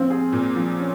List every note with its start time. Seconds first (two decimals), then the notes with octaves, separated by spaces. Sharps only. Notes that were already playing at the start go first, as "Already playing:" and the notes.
Already playing: F3 C4 F4
0.10 G#4
0.32 A#2
0.56 F3
0.79 C#4